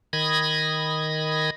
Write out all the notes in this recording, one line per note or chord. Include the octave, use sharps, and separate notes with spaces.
D#3 B5 D#6 G#6 A#6